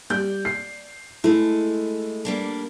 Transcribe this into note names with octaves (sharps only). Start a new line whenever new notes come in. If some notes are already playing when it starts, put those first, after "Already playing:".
G3 D5 G6
C7
G#3 A3 E4
G3 A#3 D4